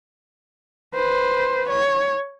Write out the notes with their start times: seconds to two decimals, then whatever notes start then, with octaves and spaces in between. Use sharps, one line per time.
0.94 B4 C5
1.69 C#5